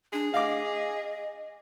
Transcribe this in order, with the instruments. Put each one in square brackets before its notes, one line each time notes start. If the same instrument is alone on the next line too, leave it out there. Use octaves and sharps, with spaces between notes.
[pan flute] D4 [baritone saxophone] G#4
[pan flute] D#5 [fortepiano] F5 D6